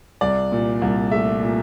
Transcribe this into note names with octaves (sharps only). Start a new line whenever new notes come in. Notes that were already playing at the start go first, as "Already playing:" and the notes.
C2 D5
A#2
C2
A3 E5
A#2